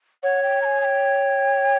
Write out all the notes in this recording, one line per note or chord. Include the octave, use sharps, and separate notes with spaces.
C#5 F#5
G5
A#5
G#5
G#5
G5